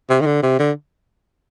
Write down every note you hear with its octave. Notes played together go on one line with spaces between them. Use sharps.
C3
D#3
D3
C3
D3